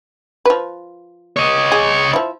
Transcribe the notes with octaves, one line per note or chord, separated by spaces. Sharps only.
F3 B4
C#5 D#5
G#4
F3 E4